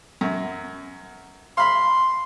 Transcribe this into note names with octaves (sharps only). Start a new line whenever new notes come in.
F#2
F5 B5 C6